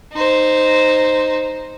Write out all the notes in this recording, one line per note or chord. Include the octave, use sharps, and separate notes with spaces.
D#4 C5